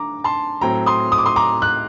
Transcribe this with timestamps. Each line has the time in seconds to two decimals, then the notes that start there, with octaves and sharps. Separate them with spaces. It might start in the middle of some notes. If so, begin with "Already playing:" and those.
Already playing: D3 A3 A#5 D6
0.24 A5 C6
0.61 A2 F#3 C4 G5 A#5
0.86 C6 D#6
1.12 D#6
1.18 D6
1.26 C6 D#6
1.36 A#5 D6
1.62 F#6